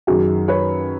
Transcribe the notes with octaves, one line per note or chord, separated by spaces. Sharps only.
F#2 D#3 F#3 F#4 G#4
B4 C#5